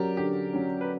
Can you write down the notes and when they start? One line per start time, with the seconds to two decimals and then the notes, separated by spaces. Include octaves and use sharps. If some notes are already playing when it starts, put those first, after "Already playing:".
Already playing: F#3 C#4 G4 A#4 D5
0.17 D3 G4
0.53 F#3 C#4
0.81 B4